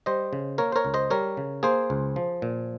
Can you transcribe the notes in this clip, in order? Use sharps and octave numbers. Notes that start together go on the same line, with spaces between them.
G3 C5 D#5
C#3
A#3 A#4 C#5
C5
A#4 C#5
C#2
C5 D#5
G3 A#4 C#5
C#3
A#3 G#4 C5
C#2
F3
A#2